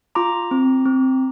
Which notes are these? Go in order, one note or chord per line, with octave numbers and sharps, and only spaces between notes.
F4 A#5 D6
C4
C4